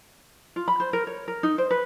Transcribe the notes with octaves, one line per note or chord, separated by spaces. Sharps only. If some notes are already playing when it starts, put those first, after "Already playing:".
F4
B5
C5
A#4
C#5
A#4
D#4
C5
B4